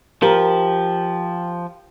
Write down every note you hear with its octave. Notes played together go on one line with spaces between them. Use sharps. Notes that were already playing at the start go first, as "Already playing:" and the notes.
F3 G4 A#4